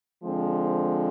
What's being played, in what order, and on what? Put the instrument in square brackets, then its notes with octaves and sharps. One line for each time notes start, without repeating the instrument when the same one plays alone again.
[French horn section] D3 F3 G#3 C4